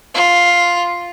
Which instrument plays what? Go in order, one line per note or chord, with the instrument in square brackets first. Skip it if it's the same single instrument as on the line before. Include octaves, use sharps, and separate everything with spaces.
[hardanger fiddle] F4